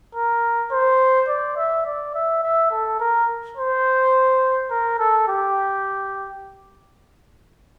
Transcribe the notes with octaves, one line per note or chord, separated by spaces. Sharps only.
A#4
C5
D5
E5
D5
E5
E5
A4
A#4
C5
A#4
A4
G4